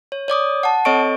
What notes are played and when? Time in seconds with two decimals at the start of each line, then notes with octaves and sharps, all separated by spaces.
0.12 C#5
0.28 C#5 D5 D6 D#6
0.63 F#5 A5
0.85 C4 A4 C#5 D#5 C#6 D7